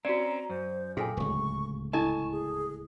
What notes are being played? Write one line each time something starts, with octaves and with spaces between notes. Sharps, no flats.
C4 C#4 F#4 D5 A#5
F#2 C5
A#2 G#4 A4 G5 G#5
D1 C#2 C#6
E4 A4 D#5 G#5 A5 C#6
G#4